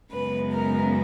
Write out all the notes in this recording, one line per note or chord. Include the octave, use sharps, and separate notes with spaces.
F#2 C#3 G#3 B3 B4
A#4